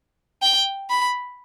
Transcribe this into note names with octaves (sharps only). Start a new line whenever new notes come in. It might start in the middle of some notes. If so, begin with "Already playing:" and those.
G5
B5